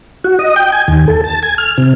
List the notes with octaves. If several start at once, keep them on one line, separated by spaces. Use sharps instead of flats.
F#4
D#5
G5
G#5
D#2
A4
A5
G#5
F6
C3